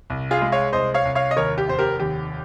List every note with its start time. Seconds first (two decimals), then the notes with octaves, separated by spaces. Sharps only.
0.10 C2
0.31 F4 G#4
0.42 G#3
0.52 C#5 F5
0.73 C2 C5 D#5
0.94 C#5 F5
1.05 C2
1.15 C#5 F5
1.31 D#5
1.36 D#2 A#4 C#5
1.58 G4
1.68 F1 C5
1.79 G4 A#4
1.99 D#2 G4